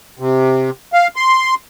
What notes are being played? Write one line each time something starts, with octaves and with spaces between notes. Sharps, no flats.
C3
F5
C6